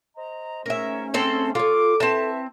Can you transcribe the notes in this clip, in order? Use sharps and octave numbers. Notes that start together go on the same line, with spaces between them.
C5 D#5 A#5
G#2 A3 C#4 A#4 E5
C4 A4 C5
F4 A4 C#5 D6
C4 E4 B4 E5 A5